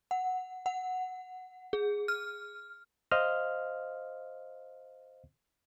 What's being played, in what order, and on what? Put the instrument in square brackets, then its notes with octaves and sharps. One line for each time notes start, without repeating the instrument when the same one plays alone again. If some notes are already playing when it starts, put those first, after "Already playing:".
[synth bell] F#5
F#5
G#4
F6
[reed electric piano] C5 D#5 F5 F6